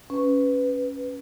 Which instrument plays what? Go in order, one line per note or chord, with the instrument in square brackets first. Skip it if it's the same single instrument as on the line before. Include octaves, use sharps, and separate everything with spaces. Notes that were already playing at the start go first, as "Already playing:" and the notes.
[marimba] C#4 [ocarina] B4